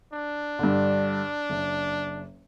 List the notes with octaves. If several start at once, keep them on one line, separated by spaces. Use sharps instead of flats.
D4
G2 D3
F#1